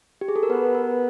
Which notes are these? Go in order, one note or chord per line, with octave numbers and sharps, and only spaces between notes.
G4
G#4
A4
A#4
B3 B4
A#4